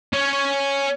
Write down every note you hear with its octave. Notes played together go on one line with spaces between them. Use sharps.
C#4 C#5